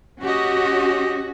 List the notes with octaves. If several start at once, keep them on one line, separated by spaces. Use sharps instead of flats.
C#4 F#4 G4 D#5